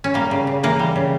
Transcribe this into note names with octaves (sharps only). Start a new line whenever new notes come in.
C#4
G3 A#3
C#3
C#3
E3 A#3
G3
C#3